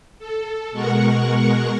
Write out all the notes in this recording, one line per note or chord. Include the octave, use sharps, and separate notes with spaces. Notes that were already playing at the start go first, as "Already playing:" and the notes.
A4
B2 G#3 A#4 F#5 C#6